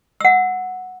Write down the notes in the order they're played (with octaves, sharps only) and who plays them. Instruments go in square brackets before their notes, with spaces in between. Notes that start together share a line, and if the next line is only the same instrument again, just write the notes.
[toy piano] F#5 E6